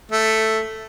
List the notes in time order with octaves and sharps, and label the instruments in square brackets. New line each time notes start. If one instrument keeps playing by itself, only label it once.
[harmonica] A3